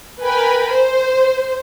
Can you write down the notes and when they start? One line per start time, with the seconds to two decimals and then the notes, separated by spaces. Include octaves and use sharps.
0.24 A#4 B4 G5 G#5 B5
0.71 C5